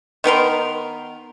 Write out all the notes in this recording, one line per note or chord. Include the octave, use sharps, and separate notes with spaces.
D#3 B3 A#4 C6